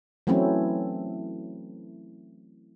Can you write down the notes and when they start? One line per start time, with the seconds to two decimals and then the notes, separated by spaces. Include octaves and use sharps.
0.27 E3 F#3 A3 C4 C#4 E4